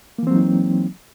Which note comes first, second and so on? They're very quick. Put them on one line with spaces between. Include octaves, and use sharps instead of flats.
A#3 E3 C4 F#3 D#4